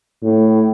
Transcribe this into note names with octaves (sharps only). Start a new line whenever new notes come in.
A2